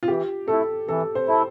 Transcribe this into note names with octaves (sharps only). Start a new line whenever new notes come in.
F4
E3 G4
A3 E4 A4
E3 A4
C5
A3 E4